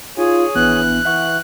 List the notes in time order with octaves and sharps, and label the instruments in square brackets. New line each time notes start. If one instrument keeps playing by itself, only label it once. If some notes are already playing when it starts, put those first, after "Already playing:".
[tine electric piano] D#4 [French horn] F4 [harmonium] G#4 C#5 G#5
[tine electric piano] A#1 B3 D4 [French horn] E3 [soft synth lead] F#6
[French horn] E3 [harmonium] B3 [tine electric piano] E5 F#5 C#6